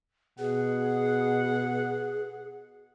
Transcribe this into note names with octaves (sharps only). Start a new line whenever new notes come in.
B2 G#4 F#5